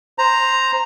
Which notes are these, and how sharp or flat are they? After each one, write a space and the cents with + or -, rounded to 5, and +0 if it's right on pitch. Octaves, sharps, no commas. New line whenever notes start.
C5 +0 A#5 +0